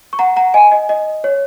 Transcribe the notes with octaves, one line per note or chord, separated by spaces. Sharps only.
C#6
F#5 A#5
F#5 A#5
D#5 G#5
D#5
D#5
C#5